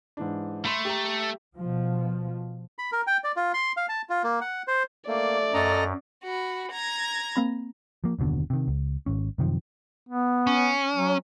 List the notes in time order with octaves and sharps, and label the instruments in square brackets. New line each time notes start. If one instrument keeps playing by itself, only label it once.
[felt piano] G#2 E3 D4
[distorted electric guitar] A3 [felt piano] B5 C6
[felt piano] G4 A#5
[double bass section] B2 F3
[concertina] B5
A#4
G5
D5
F4
C6
F5
A5
F4
A#3
F#5
C5
[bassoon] A3 [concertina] A#3 [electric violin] D5
[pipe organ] F#2 [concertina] A4 D#5 A#5
[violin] F#4 B5
A#5 G#6
[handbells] A#3 C4 B5
[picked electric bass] F3 A#3
F#1 D#2 B2 D3
C3 D#3
C#2
G#1 C#4
F#2 C3 D#3 F3
[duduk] B3
[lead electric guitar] C#4
[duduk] F#3